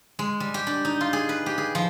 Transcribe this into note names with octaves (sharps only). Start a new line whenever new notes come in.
G#3
G3
G4
D4
D#4
F4
G#4
B4
G4
G#4
F3